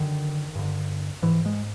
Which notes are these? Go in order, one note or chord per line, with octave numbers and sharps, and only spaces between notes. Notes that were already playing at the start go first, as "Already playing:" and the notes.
Already playing: F#2 D3 D#3
G2 D3
G#2 E3
G#3